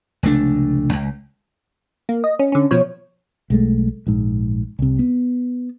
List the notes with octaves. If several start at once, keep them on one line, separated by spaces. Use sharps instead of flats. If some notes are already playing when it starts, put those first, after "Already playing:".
F1 C#2 A3 D4
C#2
A#3
D#5
C#4
D3 C#4
B2 F3 C#5
B1 G#3 A3
A#1 G#2
C2 C3
B3